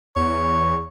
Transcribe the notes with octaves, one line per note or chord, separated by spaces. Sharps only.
E2 C#5